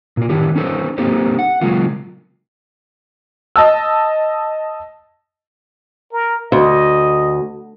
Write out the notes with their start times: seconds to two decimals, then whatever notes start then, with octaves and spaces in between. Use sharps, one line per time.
0.17 A#2 F4
0.30 A2 D#3 E4 G4
0.56 C#4 D#4 A4 C5
0.98 A#3 C4 D#4 G4 A4 C5
1.39 F#5
1.61 C#3 F#3 G#3 A#3 F4
3.56 D#5 A5 E6
6.13 A#4
6.52 D2 D#5